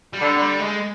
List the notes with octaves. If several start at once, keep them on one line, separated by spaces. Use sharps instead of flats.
G3
D3
G3
G#3